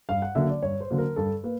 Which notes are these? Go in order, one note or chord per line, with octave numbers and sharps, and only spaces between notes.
G2 F5
F#5
D3 F#3 A#3 E5
D5
G2 C#5
C5
D3 F#3 A#3
A#4
G2 A4
A#3 B4